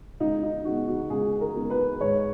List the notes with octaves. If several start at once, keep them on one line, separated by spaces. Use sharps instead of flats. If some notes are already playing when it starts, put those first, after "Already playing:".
C#2 D#4
D#4
C#3 G#3 B3 F#4
F#4
C#2 G#4
A#4
C#3 G#3 B3
B4
G#2 C#5